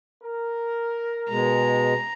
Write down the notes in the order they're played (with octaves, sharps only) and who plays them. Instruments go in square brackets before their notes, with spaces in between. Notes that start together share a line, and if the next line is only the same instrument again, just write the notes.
[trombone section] A#4
[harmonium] B2 G#3 [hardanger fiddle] A#5